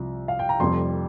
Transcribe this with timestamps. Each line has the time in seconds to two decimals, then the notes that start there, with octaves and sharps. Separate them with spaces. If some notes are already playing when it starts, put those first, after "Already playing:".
Already playing: C2 C3 F3
0.28 F5
0.39 G5
0.49 A#5
0.60 F1 F2 C3 G3 C6